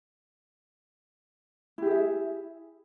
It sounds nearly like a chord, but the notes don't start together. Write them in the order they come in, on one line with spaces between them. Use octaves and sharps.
E4 G4 G#4 E5